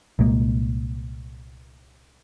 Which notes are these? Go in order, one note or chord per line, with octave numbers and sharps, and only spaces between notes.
C2 A#2 G#3 A#3